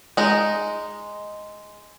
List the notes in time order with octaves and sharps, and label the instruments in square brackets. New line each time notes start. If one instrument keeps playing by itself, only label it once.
[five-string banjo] G#3 D#4